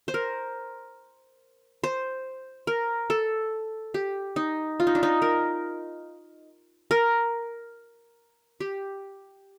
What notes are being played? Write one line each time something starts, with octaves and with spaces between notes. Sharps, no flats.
C5
A#4
C5
A#4
A4
G4
D#4
F4
D#4
D4
D#4
A#4
A#4
G4